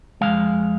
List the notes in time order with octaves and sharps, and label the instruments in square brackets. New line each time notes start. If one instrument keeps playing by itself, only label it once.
[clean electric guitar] F2 D#3 G#3 F5